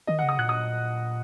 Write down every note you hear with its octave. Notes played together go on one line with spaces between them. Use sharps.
D#3 D#5
F#5
C#3
D#6
A#2 F#6
D#6